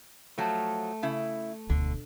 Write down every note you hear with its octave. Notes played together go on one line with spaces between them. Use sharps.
F3 F#3 A3 A5
C#3 E4
E1 D2 D3